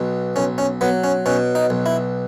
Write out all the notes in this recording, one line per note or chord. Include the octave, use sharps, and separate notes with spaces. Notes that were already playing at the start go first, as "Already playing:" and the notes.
Already playing: B1 B2
B1 C#4
C#4
F#3 B3
C#4
B2 C#4
D#4
B1
E4